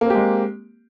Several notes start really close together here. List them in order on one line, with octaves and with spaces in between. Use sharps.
A#3 C4 G4 G#3